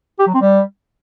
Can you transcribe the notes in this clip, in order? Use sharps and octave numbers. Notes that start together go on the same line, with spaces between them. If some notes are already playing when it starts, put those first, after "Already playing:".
G4
F#3
C4
G3